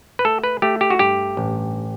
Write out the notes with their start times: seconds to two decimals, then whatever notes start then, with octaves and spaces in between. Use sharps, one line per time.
0.19 B4
0.25 A3 A4
0.43 B4
0.62 A3 G4
0.81 G4
0.90 F#4
0.99 G2 G4
1.37 A1